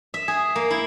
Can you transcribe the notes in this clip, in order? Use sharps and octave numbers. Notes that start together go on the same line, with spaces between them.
E5
G#4
A#3
E4